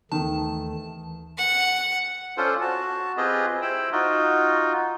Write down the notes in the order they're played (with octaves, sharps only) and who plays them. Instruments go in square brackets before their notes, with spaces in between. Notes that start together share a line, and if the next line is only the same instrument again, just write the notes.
[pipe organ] D#2 A3 [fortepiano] D#3 [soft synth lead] E3 [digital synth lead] A5
[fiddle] F#5
[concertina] C#4 D4 F4 A4 C5
F#4 A5
C4 F4 G4 G#4 B4 D#5
E4 C5 G5 B5 E6
D#4 F4 F#4